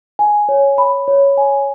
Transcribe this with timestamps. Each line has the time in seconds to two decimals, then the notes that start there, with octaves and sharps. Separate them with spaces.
0.19 G#5
0.49 C#5
0.78 B5
1.08 C#5
1.38 G#5